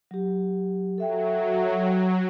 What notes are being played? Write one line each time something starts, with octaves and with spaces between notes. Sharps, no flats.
F#3 G4
F#3 A4 E5 G5